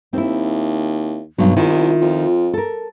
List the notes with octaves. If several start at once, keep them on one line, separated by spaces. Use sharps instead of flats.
D#2 C4 E4
B1 G2 B2 F#3
C2 D#3 E4 F4
F2
A4 A#4